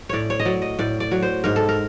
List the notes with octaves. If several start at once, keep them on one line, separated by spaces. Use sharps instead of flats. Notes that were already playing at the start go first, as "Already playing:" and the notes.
A2 C#5 D5
C#5
D#5
F#3 D5
D#5
A2 D5
D5
F#3
C5
G#2 A#4
A4
A#4